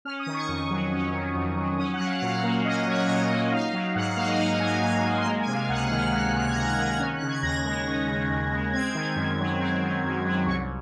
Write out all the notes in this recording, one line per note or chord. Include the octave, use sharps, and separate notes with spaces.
C#4 F6
D#6
D#3
C#6
F2
F#3
C#4
D#3
F2
F#3
C#4 D#6
F#5
F#3
F5
A#2 F#5
F5
A#3
C#4 D#5
D#5
F#3 C#5
D#5
A#2 D#5
A#3
D#4 F5
F#3
G#2 F#5
F#5
A#3 F5
D#5
D#4 D#5
F5
F#3 G#5
F5
G#2 G#5
A#3
C6
G#3 A#5
G#5
C3
F5
C#2 F#5
F6
D#3
F6
G#3 F#6
C3
F#6
G#6
C#2 A#6
G#6
D#3 A#6
G#6
C#4 F6
F#6
C#3
G#6
D#2 A#6
G#3 A#6
C#4
C#3
D#2
G#3
C4 G#6
D#3
F#2
F#3
C4
D#3
F#2
F#3
C2 C#6